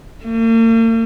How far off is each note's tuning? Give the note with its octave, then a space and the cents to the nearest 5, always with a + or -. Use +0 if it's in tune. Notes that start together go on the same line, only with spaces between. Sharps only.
A#3 -45